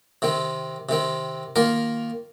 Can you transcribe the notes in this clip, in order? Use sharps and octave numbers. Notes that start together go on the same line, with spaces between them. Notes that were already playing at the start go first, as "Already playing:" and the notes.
C3 D#3 C4
C3 D#3 C4
D#3 A#3 F4 A#4